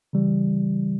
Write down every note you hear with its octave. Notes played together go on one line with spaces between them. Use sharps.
C#3 E3 G3